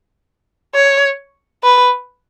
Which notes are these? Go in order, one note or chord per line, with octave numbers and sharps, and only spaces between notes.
C#5
B4